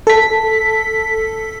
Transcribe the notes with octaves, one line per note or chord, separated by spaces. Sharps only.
A4 B6